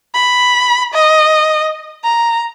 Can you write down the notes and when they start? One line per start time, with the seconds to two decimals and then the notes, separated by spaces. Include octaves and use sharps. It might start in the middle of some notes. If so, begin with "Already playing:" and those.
0.14 B5
0.94 D#5
2.04 A#5